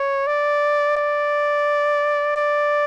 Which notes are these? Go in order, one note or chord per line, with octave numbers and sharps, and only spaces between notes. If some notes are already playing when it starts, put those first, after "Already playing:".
Already playing: C#5
D5
D5
D5